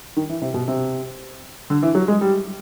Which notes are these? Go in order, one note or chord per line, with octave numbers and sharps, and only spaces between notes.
D#3
E3
C3
B2
C3
D3
E3
F#3
G#3
G3